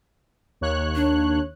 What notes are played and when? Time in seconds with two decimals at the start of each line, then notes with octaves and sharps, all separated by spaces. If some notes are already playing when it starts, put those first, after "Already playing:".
0.61 D#2 C#5 F#6
0.95 D4